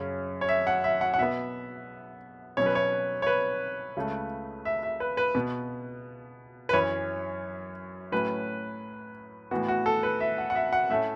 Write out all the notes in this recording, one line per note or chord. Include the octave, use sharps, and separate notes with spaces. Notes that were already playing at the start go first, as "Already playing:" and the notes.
Already playing: F#2 C#3 F#3 C#4
C#5
E5
F#5
E5
F#5
F#5
B2 B3 E5
B2 F#3 C#4 C#5
B4
C#5
C#5
B4
C#2 C#3 A3
E5
E5
B4
B4
B2 B3
B4
F#2 E3 C#4 C#5
A2 F#3 C#4 B4
A2 E3 B3 F#4
F#4
A4
B4
E5
F#5
F#5
E5
F#5
A2 A3 C#4 E5